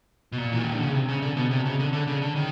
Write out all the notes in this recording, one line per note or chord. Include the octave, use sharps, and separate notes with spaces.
B2
A#2
E3
D#3
D3
C#3
C3
C#3
D3
B2
C3
C#3
D3
D3
C#3
D3
D#3